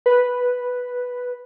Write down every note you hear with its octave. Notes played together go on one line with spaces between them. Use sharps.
B4